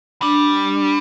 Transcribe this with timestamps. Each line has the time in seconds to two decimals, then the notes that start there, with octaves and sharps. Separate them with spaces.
0.22 G3 D4